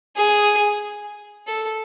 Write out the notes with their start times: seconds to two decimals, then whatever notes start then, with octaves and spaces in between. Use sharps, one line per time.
0.17 G#4
1.48 A4